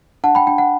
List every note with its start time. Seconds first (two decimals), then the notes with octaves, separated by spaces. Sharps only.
0.24 D4 F#5 A5
0.35 G5 B5
0.47 D4 G5
0.58 F#5